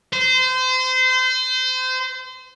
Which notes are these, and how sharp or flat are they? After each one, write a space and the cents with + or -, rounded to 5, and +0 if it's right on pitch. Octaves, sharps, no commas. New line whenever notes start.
C5 -30